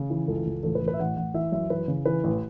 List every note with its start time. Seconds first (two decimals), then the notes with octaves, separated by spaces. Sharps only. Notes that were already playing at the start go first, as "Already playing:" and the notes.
Already playing: C#3
0.10 E3
0.28 C#2 A4
0.45 C#2
0.63 A1 A4
0.75 B4
0.82 A1
0.88 B4
0.94 E5
0.99 A1 F#5
1.17 A1 F#5
1.34 E3 E5
1.52 F#2 E5
1.70 E3 B4
1.88 C#3
2.05 E3 B4
2.24 A1